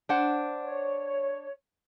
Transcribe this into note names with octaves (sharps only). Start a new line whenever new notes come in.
D4 C5 F#5
C#5